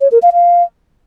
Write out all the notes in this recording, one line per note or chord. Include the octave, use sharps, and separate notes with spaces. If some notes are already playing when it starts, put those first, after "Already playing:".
C#5
A#4
F5
F5